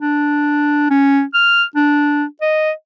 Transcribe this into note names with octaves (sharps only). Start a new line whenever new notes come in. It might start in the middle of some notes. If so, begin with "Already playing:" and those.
D4
C#4
F6
D4
D#5